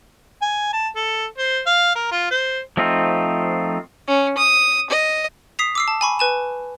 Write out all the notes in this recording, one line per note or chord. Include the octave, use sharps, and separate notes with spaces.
G#5
A5
A4
C5
F5
A#4
F4
C5
F3 A3 C4 D#4 F4
C#4
D#6
D#5
D#6 B6 C7 F7
D6 E6 C7
A5
G#5 B5 C#6
B4 G#5 E7